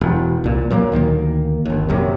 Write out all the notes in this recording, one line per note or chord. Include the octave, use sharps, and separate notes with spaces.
E1
C2 A#2
A#2 F#3 G#3 A#3
D2 D#3 E3 A#3
G1 D#2
A#1 F#2 C3